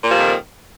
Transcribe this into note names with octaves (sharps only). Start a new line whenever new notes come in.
F2 A#2 D#3 F3 G3